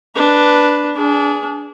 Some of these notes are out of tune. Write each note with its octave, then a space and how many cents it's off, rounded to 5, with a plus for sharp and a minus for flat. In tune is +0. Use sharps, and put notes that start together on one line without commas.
D4 +0 B4 +0
D4 -25 G#4 +0